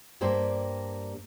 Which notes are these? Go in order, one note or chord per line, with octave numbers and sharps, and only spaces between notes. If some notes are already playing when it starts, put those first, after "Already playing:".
G2 G3 A#3 C5